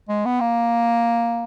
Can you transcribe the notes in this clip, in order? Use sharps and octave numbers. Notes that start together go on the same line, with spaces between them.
G#3
B3
A#3